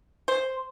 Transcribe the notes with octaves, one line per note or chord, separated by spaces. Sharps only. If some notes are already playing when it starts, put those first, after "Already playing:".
C5